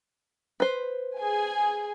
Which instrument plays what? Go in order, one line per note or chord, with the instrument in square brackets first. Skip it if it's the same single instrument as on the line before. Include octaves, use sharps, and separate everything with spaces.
[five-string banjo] B4 C5
[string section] G#4 G#5